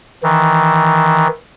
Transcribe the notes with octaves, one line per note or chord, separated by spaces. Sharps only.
D#3 E3